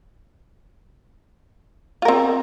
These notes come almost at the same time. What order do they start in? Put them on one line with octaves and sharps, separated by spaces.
F4 A#4 C4